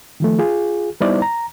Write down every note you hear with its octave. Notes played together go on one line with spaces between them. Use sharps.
D#3 F3 A3
F4 G#4
G3 B3 D#4 E4 C5 D5
A#5